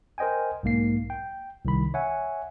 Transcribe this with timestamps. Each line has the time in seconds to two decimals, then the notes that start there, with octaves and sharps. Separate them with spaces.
0.18 A#4 C5 D#5 G5 G#5
0.63 B1 G#2 A#3 C7
1.10 G5
1.65 C2 D#3 B5
1.94 C#5 E5 F#5 G#5